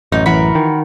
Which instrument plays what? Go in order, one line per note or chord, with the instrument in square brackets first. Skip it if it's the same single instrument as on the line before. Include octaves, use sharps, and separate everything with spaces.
[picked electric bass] A1 F#2 [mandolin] D#4
[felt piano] E3 [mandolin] F#4 A#4 B5
[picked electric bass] D#3